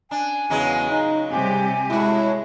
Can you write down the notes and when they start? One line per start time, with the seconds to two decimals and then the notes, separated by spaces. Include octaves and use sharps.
0.11 D4 G#5
0.50 E2 C#3 F#3 G#3
0.90 D#4
1.32 C3 G3 C4 G4 G#5
1.90 A2 G#3 E4 F#4